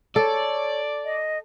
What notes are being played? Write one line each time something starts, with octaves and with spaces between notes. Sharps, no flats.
A4 C#5 D5
D#5